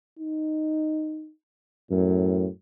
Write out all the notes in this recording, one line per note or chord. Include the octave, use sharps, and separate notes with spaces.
D#4
F#2 A2